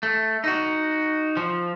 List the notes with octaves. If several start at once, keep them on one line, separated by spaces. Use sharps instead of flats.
A3
D#4 F#4
F3